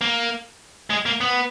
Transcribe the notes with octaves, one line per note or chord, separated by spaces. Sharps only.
A#3
G#3
A#3
B3